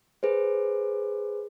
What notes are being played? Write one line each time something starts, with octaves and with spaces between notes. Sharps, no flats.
G#4 B4 C5